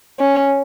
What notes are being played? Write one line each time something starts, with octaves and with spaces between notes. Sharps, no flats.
C#4